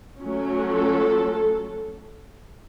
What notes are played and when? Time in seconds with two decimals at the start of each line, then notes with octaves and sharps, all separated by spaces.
0.21 F#3 A3 C#4
0.75 A4